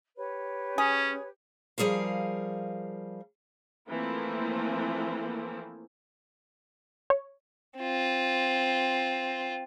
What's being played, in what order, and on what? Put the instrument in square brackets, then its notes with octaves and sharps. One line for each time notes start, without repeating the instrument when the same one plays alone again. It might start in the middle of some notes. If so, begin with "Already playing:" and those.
[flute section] G4 B4 C#5
[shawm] C#4 [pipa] G#4
[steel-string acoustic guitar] F3 G3 G#4 A#4 F5
[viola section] E3 F3 A3 A#3 C4 E4
[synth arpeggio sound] C#5
[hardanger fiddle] C4 F4